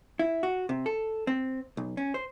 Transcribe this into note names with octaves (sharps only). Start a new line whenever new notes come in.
E4
F#4
C3
A4
C4
B1
C#4
C5